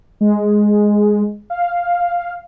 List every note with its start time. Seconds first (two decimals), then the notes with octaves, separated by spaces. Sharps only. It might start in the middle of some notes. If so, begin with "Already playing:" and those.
0.21 G#3
1.50 F5